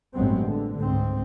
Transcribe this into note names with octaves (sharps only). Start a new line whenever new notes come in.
A1 G2 F#3 G#3 B3 C4
D3
C#2 G#2 C4